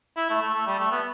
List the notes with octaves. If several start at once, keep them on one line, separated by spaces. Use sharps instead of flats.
E4
A3
A3
A3
G3
A3
B3